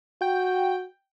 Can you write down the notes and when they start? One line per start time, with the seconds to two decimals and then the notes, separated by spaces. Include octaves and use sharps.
0.22 F#4 G5